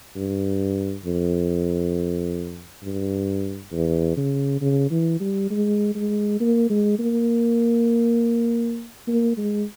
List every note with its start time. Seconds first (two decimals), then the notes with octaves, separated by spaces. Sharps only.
0.16 G2
1.05 F2
2.83 G2
3.72 E2
4.17 C#3
4.61 C#3
4.91 E3
5.21 G3
5.51 G#3
5.95 G#3
6.40 A#3
6.70 G#3
6.99 A#3
9.08 A#3
9.37 G#3